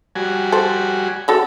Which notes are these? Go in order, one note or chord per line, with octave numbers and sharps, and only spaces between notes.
G3 F#4 G#5
A4 C5
C4 F#4 A4